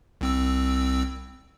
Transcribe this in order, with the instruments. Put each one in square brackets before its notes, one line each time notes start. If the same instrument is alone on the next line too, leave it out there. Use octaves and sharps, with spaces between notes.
[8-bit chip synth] C2 C4 E6